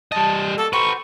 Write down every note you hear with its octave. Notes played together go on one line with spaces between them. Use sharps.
G3 D#5 A5
A#3 F#4 A4 A5
F#4 A4 B4 C5 G5 C#6